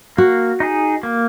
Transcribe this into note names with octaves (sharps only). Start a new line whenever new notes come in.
A#3 F#4
D#4 G#4
A#3